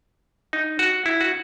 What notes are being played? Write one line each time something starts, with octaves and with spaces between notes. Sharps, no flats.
D#4
F#4
E4
F#4